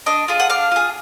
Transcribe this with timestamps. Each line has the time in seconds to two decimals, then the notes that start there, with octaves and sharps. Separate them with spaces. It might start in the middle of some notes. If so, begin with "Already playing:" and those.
0.06 D4 D#5
0.28 F4 G#4
0.40 F#5
0.50 D4 F5
0.72 F4 G#4